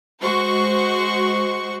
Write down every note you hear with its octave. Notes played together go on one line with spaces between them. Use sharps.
G#3 F#4 C5 C#6